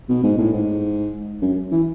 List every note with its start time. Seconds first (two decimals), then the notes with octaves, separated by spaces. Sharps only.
0.09 B2
0.23 G#2
0.38 A2
0.53 G#2
1.42 F#2
1.72 E3